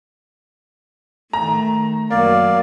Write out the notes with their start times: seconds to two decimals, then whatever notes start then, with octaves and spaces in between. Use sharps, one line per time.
1.33 D#3 A3 A#5
2.10 F#2 F#3 A#3 D5 F5